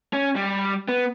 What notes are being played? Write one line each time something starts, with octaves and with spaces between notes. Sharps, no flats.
C#4
G3
B3